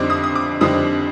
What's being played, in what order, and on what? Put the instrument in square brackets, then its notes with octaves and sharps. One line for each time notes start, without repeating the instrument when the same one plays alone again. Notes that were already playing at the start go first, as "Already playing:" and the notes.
Already playing: [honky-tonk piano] F2 D3 G3 C4 D#4 D6
D#6
D#6
D6
F2 D3 G3 C4 D#4 D#6